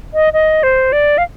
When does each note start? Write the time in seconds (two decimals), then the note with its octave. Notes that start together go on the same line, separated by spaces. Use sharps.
0.14 D#5
0.33 D#5
0.63 C5
0.92 D5
1.18 F5